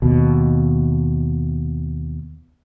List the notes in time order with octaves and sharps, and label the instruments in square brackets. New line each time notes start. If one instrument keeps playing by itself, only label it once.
[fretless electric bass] D#2 B2